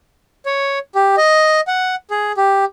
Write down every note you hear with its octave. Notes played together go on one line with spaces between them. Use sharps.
C#5
G4
D#5
F#5
G#4
G4